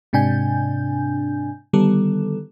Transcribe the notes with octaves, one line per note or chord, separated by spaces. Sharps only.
G#2 C3 D4 G#5 G6
D3 D#3 G3 B3 A4